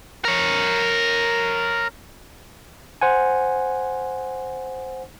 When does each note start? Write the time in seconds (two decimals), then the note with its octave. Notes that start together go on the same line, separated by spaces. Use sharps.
0.25 A#4 C#5
3.01 C5 F#5 G#5